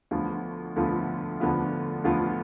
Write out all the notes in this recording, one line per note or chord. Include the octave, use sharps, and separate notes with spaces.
D2 D3 F3 B3 F4
D2 D3 F3 B3 F4
D2 D3 F3 B3 F4
D2 D3 F3 B3 F4